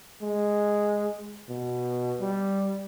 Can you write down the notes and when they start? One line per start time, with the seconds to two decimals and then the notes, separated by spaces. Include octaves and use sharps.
0.22 G#3
1.49 B2
2.21 G3